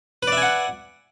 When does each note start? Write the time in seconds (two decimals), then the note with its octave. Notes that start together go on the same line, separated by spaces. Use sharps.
0.23 B4
0.27 D5
0.32 E5
0.37 G#5
0.42 F#5